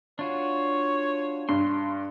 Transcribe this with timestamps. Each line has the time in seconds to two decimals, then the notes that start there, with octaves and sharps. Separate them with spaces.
0.19 D4 F4 F#4 C#5
1.49 G2 C6